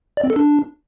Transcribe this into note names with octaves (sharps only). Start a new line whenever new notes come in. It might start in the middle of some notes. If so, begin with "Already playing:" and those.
D5
C4
A4
D4